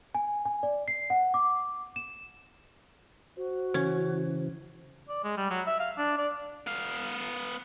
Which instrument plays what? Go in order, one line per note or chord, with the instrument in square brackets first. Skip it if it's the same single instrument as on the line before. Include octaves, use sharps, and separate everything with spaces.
[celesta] G#5
G#5
D5
C7
F#5
D6
E7
[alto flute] F#4 [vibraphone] C5
[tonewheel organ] C#3 E3 [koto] C#4
[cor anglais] D5
G#3
G3
F#3
E5
F5
D4
D5
[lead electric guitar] B3 F5